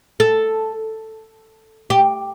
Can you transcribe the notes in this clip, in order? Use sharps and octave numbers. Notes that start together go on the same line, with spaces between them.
A4
G4